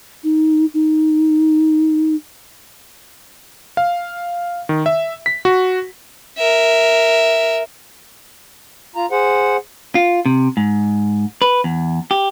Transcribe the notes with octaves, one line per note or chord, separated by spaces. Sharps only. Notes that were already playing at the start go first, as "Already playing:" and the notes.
D#4
D#4
F5
D#3
E5
B6
F#4
A#4 E5
F4 A#5
G#4 C5 F#5
F4
C3
G#2
B4
E2
G4